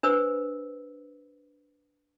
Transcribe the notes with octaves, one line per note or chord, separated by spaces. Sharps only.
D4 B4 C5 E6